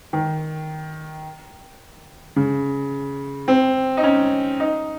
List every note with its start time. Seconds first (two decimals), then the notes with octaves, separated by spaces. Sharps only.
0.13 D#3
2.36 C#3
3.48 C4
3.97 D#4
4.03 C#4
4.60 D#4